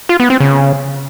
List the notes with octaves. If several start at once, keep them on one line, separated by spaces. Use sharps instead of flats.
F4
B3
C4
C#3